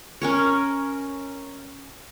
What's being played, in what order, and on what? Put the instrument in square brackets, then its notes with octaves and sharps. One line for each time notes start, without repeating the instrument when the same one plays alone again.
[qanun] C#4 A#4 C#5